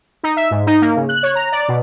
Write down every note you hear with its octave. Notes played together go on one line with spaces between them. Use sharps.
D#4
E5
G#2
D#4
A#3
C#3
F#6
C#5
A#5
D5
B2